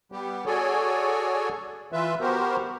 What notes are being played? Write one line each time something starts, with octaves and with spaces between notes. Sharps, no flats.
G3 B3 G4
F#4 G#4 A4 C#5 D5 G#5
E3 F4 B4 E5
B3 F#4 G4 A#4 C5